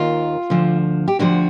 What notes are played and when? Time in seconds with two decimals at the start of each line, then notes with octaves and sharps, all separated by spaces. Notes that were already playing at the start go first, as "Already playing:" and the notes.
Already playing: D#2 D#3 F4
0.50 D2 D3 F3
1.08 G4
1.19 D2 D3 F3 F#4